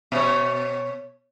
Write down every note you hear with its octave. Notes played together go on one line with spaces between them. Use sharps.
B2 C#5